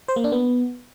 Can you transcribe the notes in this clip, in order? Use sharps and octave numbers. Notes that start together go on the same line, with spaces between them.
C5
A#3
D4
B3